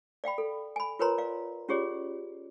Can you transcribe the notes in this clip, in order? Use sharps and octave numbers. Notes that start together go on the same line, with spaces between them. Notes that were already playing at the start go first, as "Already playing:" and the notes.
D5 F5 G5 B5
A4
G#5 B5
F4 A#4 B4 C#5 A#5 C6
D5 F5
C#4 F4 G4 G#4 C#5 D5